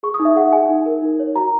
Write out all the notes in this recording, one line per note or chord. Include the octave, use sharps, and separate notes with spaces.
G#4 C#6
D#6
D#4
E5
G#4 F#5
G#4 G#5
D#4
A#4
D#4
C#5
F#4 A#5